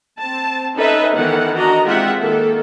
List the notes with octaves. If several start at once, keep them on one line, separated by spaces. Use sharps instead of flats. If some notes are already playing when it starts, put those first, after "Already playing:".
C4 A5
C#4 D#4 A4 B4 D#5 E5
D#3 E3 B3 A4 F#5
D4 F#4 D#5 A#5
G#3 C4 F4 G4 E5 F#5
D#3 A#3 A4